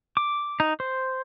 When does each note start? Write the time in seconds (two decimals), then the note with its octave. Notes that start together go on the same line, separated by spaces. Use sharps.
0.17 D6
0.60 D#4
0.80 C5